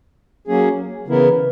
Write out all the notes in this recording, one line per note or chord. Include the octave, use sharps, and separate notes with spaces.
F#3 A#3 C#4 G#4
C#3 E3 B3 E4 A#4